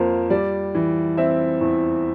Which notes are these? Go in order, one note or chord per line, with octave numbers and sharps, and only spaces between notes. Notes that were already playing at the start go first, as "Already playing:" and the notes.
Already playing: F2 A#3 A#4 C5
G3 D5
E3
C4 E5
E2